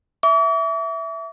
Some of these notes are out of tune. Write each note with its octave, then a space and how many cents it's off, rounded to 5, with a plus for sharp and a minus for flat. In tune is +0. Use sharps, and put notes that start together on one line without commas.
E5 +0 D6 -45